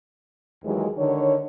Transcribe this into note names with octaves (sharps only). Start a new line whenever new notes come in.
D#2 E3 F#3 G#3
D3 D#3 C#5